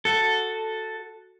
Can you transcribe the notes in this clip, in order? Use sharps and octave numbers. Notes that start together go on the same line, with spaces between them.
F#4 A4